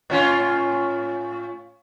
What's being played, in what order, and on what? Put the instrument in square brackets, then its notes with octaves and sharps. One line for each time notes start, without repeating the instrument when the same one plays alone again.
[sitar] A2 C#4 F4